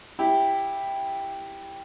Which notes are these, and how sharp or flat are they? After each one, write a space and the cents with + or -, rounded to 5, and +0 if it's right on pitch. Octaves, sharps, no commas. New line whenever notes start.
E4 +0 G4 +5